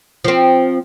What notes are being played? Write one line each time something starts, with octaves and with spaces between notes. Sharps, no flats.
F3 C4